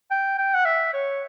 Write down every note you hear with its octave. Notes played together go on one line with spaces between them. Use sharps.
G5
G5
F#5
E5
C#5